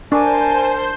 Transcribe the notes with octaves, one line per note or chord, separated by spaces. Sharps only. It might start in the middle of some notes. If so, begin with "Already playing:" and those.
D4 A#4 C5 G#5 A5 G6